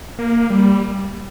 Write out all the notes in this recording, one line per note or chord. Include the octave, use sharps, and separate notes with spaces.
A#3
G3